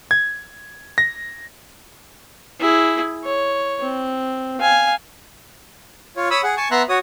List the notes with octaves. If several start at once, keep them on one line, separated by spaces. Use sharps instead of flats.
G#6
A#6
E4 G#4
C#5
C4
F5 G#5
F4 C#5
C#5 B5 D#6 E6
G#4 F#5
G#5 A5 C#6
B3 E5 A#5 C6 F#6
F#4 C#5 D#6